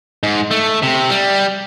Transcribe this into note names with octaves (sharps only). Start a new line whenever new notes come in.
G#2
A3
C3
G3